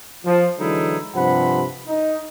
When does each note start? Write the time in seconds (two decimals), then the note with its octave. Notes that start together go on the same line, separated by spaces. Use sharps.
0.25 F3
0.58 D3 E3 F#3 G#3 D#4 E4
1.15 G2 C3 F3 F#5 B5
1.87 D#4